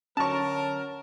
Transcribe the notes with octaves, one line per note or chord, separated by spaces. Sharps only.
D3 F#3 C#4 A#4 C#5 A5 C#6